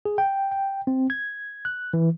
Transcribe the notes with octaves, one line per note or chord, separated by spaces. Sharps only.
G#4
G5
G5
C4
G#6
F#6
E3